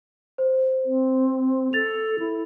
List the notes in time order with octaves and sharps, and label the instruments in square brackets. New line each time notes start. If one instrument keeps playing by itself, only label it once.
[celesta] C5
[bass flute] C4
[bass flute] A4 [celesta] A6 F7
[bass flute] E4